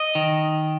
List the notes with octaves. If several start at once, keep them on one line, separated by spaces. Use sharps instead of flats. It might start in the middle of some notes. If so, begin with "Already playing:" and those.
Already playing: D#5
D#3